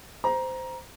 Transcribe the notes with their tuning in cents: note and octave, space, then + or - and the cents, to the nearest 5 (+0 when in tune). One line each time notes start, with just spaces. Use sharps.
C5 -15 A#5 +15